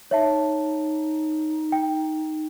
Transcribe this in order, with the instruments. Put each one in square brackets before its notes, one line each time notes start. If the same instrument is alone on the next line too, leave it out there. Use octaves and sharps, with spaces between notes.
[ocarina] D#4 [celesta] C#5 E5 A5
[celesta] G5